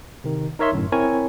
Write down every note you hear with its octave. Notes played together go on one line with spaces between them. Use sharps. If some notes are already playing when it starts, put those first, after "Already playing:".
C3 D#3
D#4 A#4 C#5 E5 C6
G1 F#2 A2
C4 E4 A#4 C#5 G#5